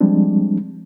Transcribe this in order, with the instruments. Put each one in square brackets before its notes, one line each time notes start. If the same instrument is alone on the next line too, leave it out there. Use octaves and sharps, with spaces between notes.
[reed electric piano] F3 G3 G#3 C4 D4